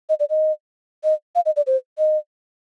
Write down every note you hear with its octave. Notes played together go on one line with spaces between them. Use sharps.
D#5
D5
D#5
D#5
F5
D#5
D5
C5
D#5